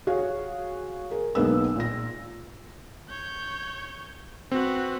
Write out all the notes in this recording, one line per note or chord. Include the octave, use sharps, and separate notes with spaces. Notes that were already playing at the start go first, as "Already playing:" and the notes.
F#4 G#4 C#5 F5
G#4 A#4
B1 G#3 A#3 B3 E6
A#2 A#6
C#5 G6
C4 F#4 B4